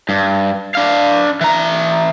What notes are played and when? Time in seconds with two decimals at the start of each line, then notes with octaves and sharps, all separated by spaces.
0.09 G2
0.75 D4 F5
1.41 E3 A#5